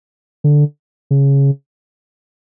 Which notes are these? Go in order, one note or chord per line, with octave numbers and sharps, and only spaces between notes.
D3
C#3